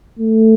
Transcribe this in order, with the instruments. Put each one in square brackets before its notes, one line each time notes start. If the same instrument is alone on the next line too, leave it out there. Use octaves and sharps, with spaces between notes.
[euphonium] A3